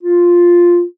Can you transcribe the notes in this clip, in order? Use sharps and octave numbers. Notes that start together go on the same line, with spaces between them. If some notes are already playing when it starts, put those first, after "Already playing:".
F4